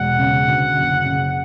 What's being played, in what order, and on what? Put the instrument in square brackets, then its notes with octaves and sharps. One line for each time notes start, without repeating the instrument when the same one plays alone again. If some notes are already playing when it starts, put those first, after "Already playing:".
Already playing: [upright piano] E1 [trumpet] F#5
[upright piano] C#3
D2
F#1
C#3